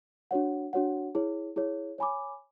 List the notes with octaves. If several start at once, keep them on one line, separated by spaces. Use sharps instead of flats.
D4 F#4 C#5 F#5
D4 F#4 C#5 F#5
E4 G#4 C#5
E4 G#4 C#5
C#5 G#5 B5 D6